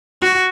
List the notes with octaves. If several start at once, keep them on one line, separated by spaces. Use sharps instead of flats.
F#4